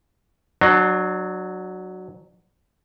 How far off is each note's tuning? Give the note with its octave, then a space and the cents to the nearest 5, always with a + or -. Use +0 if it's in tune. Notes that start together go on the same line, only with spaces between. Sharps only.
F#3 +0 D4 +35